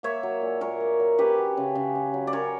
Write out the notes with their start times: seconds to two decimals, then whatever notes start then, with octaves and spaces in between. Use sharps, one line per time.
0.03 A#3 C#5 E5
0.23 F#3
0.42 A#2
0.61 A#2 A#4 C#5
0.80 A#3
1.00 F#3
1.18 C#4 G4 B4
1.38 F#3
1.57 C#3
1.75 C#3
1.95 C#4
2.14 F#3
2.27 D5
2.33 C#4 A#4 C#5